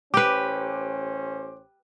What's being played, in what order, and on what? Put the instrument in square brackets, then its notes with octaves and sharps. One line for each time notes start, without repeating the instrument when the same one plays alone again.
[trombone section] A1 C#4 C5 [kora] G4 B4 [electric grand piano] D6